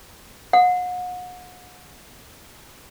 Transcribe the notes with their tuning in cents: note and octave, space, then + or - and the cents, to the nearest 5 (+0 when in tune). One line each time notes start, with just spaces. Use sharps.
F#5 -40